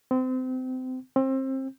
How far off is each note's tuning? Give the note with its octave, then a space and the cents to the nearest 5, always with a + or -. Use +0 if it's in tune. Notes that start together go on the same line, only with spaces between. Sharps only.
C4 -30
C4 +25